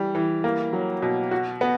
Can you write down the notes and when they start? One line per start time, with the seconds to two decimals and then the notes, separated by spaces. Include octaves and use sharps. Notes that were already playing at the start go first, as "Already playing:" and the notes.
Already playing: E3 G3
0.15 E3
0.44 A#3
0.73 F#3
1.02 B2
1.31 F#4
1.61 B3